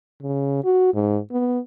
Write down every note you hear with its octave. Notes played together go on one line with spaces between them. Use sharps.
C#3
F#4
G#2
B3